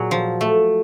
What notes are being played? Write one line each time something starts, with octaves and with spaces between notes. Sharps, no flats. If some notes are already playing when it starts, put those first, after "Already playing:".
Already playing: A#2 F#3 G#4
F3
A3